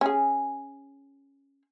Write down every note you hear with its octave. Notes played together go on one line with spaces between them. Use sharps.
C#4 G#4